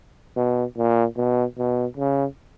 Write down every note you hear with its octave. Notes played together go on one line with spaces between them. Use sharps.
B2
A#2
B2
B2
C#3